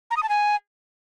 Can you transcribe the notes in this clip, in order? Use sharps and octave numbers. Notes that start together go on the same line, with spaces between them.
A#5
D#6
A5
G#5